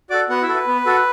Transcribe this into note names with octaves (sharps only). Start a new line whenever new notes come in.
F#4 A4 D5 D6
B3 F#4 F#5
E4 E5
F#4 A4
B4
B3
F#4 A4